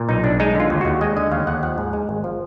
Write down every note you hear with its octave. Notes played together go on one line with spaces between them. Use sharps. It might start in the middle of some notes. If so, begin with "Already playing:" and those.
Already playing: A#2
B1 D#4
B1 D4
G#3 D#4
D3 F4
D#2
D#2 F#4
G#3 D#5
D3 D#5
D#2 F5
D#2 F#5
F3 F#5
G#2
G#3
G#1
F3